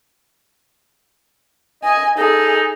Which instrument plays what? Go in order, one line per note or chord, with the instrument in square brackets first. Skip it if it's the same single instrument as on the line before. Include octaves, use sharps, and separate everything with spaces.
[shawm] D#5 [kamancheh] G#5
[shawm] D#4 [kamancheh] G#4 A4